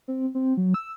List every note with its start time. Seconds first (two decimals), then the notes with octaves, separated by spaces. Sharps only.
0.08 C4
0.35 C4
0.57 F#3
0.74 E6